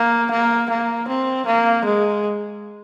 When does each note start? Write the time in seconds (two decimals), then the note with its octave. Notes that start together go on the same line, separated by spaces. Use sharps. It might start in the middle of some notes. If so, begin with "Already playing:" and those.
Already playing: A#3
0.31 A#3
0.70 A#3
1.08 C4
1.46 A#3
1.85 G#3